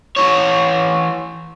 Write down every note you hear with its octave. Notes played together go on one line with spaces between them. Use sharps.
E3 C#5